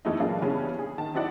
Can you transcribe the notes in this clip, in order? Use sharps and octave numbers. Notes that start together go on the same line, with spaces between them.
F2 E3 A3 D#4
A#2 F#3 G#3 A#3 D4 F4
C#3 E3 G3 B3 C#4 D4
G#4
D#3 A5
C4 D#4 E4 F#4 D5 F#5